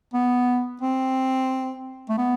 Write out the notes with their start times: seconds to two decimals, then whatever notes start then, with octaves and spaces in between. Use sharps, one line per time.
0.14 B3
0.81 C4
2.09 A3
2.18 B3